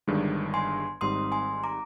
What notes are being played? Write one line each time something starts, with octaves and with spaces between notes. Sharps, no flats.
G1 G2 D#3 G#3 D4
G#5 C6
G#1 G#2 G3 C4 D#4 C6 D#6
G#5 C6
A#5 D6